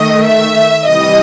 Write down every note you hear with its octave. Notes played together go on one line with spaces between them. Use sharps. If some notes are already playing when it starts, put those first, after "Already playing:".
Already playing: D#3 A3 D#5
E5
C3 E3 G3 D#5